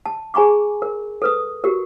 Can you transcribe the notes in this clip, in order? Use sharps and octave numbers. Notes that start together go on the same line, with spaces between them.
A5
G#4 G#5 A#5 C#6 D6
A#4
A4 B4 D#6
F#4 G4 A#4